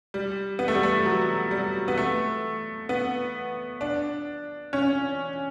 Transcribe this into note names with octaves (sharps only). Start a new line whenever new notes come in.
G3
B3
A3
G3
A3
F#3
G3
B3
A3
B3
D4
C#4